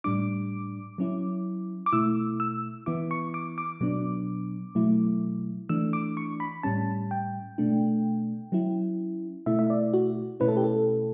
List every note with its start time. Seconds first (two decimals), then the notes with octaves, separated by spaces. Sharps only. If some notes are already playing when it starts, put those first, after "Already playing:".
0.04 A2 G3 D4 D6
0.98 F#3 C#4 E4
1.86 D6
1.92 B2 A3 E4 E6
2.40 E6
2.86 E3 B3 E4 D6
3.11 C#6
3.34 D6
3.58 D6
3.81 B2 F#3 B3 D4
4.75 B2 F#3 A3 E4
5.69 E3 A3 D4 E6
5.93 D6
6.17 C#6
6.40 B5
6.63 A2 G3 C#4 A5
7.11 G5
7.58 B2 A3 D4
8.52 F#3 C#4 E4
9.46 B2 A3 E4 E5
9.59 E5
9.70 D5
9.93 F#4
10.40 B2 A3 C#4 E4 B4
10.48 A4
10.57 G4
10.64 A4